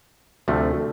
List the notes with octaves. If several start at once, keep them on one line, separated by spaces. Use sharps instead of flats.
D2 C3 F3 A3